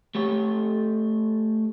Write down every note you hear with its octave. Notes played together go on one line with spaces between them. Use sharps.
A3 G4 A4 C#5